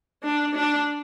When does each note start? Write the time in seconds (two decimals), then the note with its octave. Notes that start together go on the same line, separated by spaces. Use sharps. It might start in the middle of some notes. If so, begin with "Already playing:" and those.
0.23 D4
0.55 D4